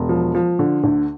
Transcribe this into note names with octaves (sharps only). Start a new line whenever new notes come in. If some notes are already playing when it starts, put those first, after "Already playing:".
Already playing: E1
F3
F3
D3
D2